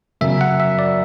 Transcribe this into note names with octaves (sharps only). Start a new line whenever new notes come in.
F#2 C#3 F#3 E5
F#5
E5
D5